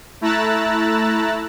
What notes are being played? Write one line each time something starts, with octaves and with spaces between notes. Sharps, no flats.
A3 E4 A#5 E6 F#6 A6